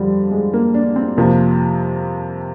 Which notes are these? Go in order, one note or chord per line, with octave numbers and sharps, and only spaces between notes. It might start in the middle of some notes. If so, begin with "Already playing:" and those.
Already playing: F2 D3 F3 G3
G#3
A#3
D4
C4
F2 C3 F3 A#3